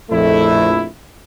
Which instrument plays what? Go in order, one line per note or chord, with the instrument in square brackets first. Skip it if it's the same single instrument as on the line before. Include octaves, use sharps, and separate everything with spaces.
[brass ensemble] A#1 F2 A3 E4